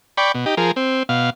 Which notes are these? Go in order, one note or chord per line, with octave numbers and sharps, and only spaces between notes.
D5 G5 B5 C#6
B2
D#4 G4
F3 G#4 A#4
C4
B2 F5